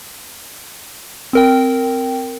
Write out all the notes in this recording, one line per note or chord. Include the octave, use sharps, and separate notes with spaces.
C4 A#4 G5